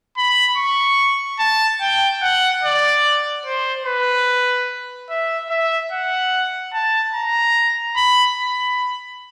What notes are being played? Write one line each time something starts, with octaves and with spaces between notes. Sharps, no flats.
B5
C#6
A5
G5
F#5
D5
C5
B4
E5
E5
F#5
A5
A#5
B5
B5